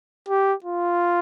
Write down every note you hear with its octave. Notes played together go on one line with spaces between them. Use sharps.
G4
F4